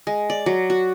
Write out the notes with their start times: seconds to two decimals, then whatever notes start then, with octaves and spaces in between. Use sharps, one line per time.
0.07 G#3
0.30 D5
0.46 F#3
0.70 F#4